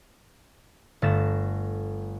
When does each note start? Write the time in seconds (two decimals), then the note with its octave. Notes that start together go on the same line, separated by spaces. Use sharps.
1.02 G1 A3 A6 A#6 E7